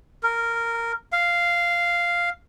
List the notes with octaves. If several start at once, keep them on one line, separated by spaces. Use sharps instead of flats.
A#4
F5